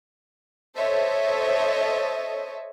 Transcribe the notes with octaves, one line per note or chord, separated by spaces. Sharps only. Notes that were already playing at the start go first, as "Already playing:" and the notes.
A4 C5 C#5 D#5 E5